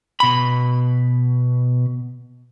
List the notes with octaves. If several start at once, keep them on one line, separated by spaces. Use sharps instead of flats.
B2 B5